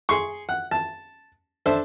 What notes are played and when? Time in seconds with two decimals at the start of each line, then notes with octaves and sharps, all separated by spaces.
0.09 G#4 C6 C#6
0.49 F#5
0.71 A5
1.66 D4 A4 C5 E5